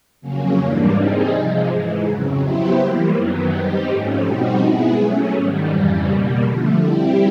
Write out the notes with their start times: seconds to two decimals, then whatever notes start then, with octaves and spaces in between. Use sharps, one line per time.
0.21 F2 C#3 F#3 A#3 C#4
0.58 G#2 E3 G3 A#3 D4
0.94 G3 C4 D#4 G#4
1.30 C3 F3 G#3
1.67 G#2 E3 G#3
2.04 F2 C#3 F#3
2.40 F#3 B3 E4 G4 C5
2.76 E3 G3 A#3
3.13 F#2 D#3 F#3 B3
3.50 G3 C4 D#4 G4
3.86 G#2 F3 A3 C#4
4.22 B2 G3 C4 D#4 F#4
4.59 G#3 B3 E4 G#4
4.96 F#3 A3 C#4
5.33 G#2 D#3 G3
5.68 F2 C#3 E3 G3
6.05 B2 G3 A#3
6.42 D3 F3 A3
6.78 G3 C4 E4 G4